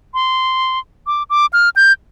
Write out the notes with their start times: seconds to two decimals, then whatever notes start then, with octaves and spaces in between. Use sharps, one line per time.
0.14 C6
1.07 D6
1.30 D6
1.53 F6
1.76 G6